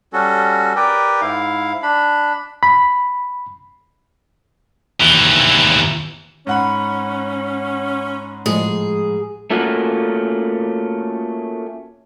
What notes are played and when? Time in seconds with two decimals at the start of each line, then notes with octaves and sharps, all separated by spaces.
0.13 G3 C#4 F#4 A4
0.76 G4 A#4 B4 D5 G5
1.21 G#2 E4 F5
1.83 D4 B5
2.63 B5
5.01 D#2 E3
6.47 G#2 C#4 F#5 B5
8.46 A2 F3 G#3 G#4
9.51 A3 A#3 C#4 F4 F#4